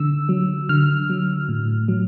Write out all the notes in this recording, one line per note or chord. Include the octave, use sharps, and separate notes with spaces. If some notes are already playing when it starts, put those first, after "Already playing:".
Already playing: D3 E6
F#3
D3 F6
F#3
A2
F#3